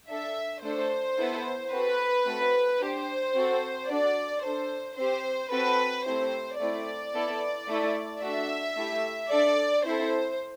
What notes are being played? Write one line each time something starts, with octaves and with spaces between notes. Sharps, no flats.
D4 A4 E5
A3 D4 A4 C5
B3 E4 A4
C4 F#4 A4 B4
A3 C4 F#4 A4
D4 G4 C5
C4 F#4 A4
D4 F#4 A4 D5
D4 A4 C5
C4 G4 C5
C4 F#4 A4 B4
A3 C4 E4 G4 C5
A3 C4 E4 D5
B3 E4 A4
A3 E4 A4
A3 D4 F#4 A4 E5
A3 E4 G4
D4 A4 D5
C4 E4 A4 C5